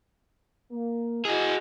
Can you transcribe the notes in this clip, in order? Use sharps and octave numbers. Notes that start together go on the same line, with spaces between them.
A#3
E4 F#4 G#4 D#5